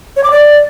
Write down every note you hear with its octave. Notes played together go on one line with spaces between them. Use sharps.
C#5
D6
D5